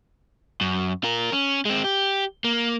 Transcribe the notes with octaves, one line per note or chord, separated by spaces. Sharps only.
F#2
F4 A#4
C#4
G#3 C4
G4
A#3